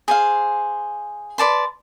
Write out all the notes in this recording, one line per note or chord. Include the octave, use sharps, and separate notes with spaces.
G#4 C5 F5
B4 D5 A5 C6